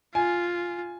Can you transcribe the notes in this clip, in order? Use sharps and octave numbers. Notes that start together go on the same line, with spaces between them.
F4 G#5